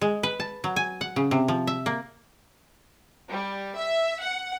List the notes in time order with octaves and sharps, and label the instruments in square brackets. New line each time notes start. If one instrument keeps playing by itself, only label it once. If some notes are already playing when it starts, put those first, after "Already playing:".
[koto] G#3
B4
A5
F#3
G#5
F#5
C#3
C3
F3
E5
A#3
[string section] G3
E5
F#5